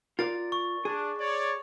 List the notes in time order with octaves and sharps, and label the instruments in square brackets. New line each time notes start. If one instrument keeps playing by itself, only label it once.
[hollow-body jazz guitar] F4 A#4 D5 [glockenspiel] A6
[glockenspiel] C#6
[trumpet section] D4 [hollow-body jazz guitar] G#4
[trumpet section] C#5 D5